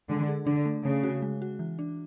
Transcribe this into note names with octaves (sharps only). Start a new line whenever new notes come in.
D3 G#3
G#4
D3 D4
A3
C#3 A3
F#4
G#3
F#4
E3
D4